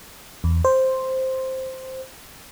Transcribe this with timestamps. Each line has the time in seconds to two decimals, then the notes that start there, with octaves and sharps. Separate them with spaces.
0.44 E2
0.65 C5